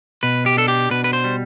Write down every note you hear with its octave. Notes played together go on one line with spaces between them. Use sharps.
B2 B4
G4
D4 A4
G4
B2 B4
B4
C5
G3